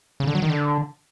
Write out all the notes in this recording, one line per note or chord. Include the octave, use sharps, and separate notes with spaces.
C#3
D3
F#3
D#3
D3